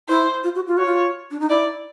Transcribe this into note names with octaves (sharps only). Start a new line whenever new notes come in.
E4 C5
F4
F#4
F4
F#4 C#5
F4
D4
D#4
E4 D5